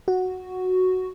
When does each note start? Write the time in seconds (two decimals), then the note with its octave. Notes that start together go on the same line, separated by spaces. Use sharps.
0.08 F#4